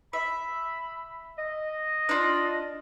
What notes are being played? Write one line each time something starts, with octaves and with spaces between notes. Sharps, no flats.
E5 B5
D#5
D4 F4